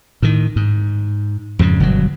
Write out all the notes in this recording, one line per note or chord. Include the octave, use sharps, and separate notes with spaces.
A2 D#3
G#2
F2 G#2 C#3
G1 B2 F#3